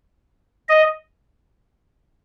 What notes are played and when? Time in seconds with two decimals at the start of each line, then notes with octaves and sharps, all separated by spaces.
0.69 D#5